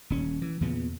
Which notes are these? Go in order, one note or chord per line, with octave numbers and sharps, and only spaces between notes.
D#1 C#4
E3
E2 A#2 C#3 B3